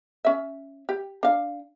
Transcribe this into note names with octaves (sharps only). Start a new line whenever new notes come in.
C#4 E5
G4
D4 F5